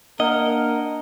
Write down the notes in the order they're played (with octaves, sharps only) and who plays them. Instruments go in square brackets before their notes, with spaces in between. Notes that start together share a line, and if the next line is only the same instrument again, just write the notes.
[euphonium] A#3 [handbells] D4 F#5 F6 [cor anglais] A#4 [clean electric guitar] D#5